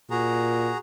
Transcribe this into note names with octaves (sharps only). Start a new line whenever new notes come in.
A#2 F#4 G#4 A#5